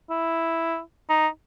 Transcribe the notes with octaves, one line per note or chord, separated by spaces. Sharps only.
E4
D#4